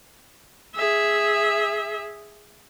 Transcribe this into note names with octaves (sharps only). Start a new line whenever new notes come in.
G#4 E5